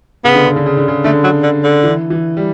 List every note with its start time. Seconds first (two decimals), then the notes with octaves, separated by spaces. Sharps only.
0.24 C#3 B3
0.35 D3
0.46 C#3
0.56 D3
0.66 C#3
0.77 D3
0.88 C#3
1.04 D3 A3
1.23 F#3
1.43 D3
1.63 D3
1.83 E3
2.10 E3
2.37 G3